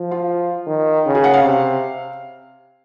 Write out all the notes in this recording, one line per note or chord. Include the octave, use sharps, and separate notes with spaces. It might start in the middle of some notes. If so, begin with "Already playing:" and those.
Already playing: F3
F4
D#3
C#3
G#4
F#5
F5
C3